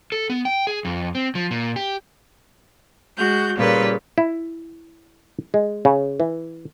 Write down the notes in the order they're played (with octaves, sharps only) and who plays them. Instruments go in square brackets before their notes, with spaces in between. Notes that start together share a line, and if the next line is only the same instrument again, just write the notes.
[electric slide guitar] A4
B3
G5
G#4
F2
C4
F3
A#2
G4
[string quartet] G#3 F#4 G6
A#2 C#3 G3 B4
[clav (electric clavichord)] E4
G#3
C#3
E3